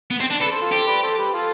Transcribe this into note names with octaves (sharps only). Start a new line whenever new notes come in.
B3
C4
D4
A4 B4 D5
A4 C5
F4 A4
G4 A4 C5
B4 D5
A4 C5
G4 B4
F4 A4